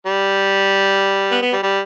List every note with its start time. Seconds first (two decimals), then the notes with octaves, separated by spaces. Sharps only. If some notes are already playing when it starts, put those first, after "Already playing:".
0.06 G3
1.31 B3
1.42 B3
1.53 G3
1.63 G3